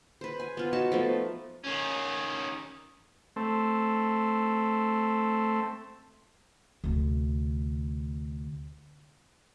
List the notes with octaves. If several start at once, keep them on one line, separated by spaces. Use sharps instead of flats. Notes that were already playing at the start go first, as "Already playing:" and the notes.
B4 C5
G#5
B3 F4
D#4 F#4 C#5 A5
F3 A3 B3
D#3 C#4
A3 C4
D2 C3